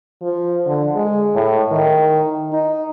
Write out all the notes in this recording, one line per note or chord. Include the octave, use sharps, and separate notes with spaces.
F3
D3
G#3
A2
D#3
D#4